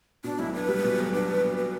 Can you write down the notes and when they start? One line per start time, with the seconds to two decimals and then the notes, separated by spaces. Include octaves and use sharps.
0.24 B2 D4
0.39 B1 E4
0.54 D4 B4
0.68 G3
0.84 B2
0.98 B1
1.13 D4 B4
1.29 G3
1.44 B2
1.57 B4